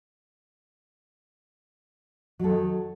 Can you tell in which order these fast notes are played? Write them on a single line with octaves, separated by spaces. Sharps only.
F#3 A4 D#3